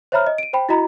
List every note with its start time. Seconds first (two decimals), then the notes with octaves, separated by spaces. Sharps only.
0.12 C5 C#5 E5 A#5 B5 F6
0.27 D#5
0.38 D7 D#7
0.53 C5 G5 B5
0.69 E4 F#4 D#5 A#5 B5